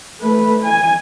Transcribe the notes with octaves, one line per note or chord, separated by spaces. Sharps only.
A3 B4
G#5